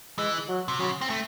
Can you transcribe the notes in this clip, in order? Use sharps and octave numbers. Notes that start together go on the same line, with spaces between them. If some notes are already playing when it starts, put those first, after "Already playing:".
E3 G#3
F#3
C3
C#3 F#3
C4
A3